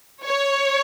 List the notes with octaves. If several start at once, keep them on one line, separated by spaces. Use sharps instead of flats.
C#5